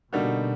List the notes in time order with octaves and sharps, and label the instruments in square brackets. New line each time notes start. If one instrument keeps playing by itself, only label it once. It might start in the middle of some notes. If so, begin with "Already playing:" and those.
[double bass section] B2 [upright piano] D3 G3 A#3 D#4 F#4